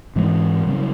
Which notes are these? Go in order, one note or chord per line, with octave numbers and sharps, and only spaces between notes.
G#2 E3 G#3
C#3 F#3 G3 C#4